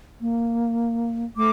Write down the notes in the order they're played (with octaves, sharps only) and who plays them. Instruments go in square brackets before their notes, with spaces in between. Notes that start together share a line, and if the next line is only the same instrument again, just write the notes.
[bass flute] A#3
[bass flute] A3 [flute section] D6